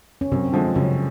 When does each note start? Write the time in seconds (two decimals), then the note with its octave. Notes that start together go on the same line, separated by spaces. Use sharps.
0.21 C#4
0.32 F#2 C3 C4
0.53 D3 F3 G#3
0.75 F#2 C#3 C#4